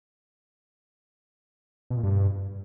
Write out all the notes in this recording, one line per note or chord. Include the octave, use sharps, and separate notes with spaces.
B2
A#2
G2